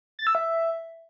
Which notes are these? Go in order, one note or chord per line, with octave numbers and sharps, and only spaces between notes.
A6
E6
E5